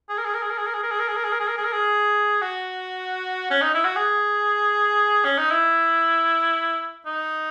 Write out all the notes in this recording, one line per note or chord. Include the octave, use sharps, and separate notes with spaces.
G#4
A#4
G#4
A#4
G#4
A#4
G#4
A#4
G#4
A#4
G#4
A#4
G#4
A#4
G#4
A#4
G#4
A#4
G#4
A#4
G#4
F#4
C#4
D#4
E4
F#4
G#4
C#4
D#4
E4
D#4